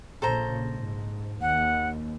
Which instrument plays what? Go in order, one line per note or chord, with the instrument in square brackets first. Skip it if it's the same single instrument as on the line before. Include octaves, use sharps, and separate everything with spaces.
[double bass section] A#1 C#3 [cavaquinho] A4 C5 A#5
[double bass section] G#2
[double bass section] D#2 [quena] F#5